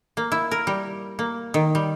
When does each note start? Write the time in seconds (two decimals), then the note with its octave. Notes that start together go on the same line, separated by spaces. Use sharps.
0.17 A#3
0.32 E4
0.51 A#4
0.67 G3
1.19 A#3
1.54 D#3
1.75 G3